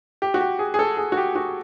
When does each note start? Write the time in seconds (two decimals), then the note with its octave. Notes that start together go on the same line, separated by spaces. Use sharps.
0.22 G4
0.34 F#4
0.40 G4
0.59 G#4
0.74 G#4
0.79 A4
0.97 G#4
1.12 F#4
1.17 G4
1.36 F#4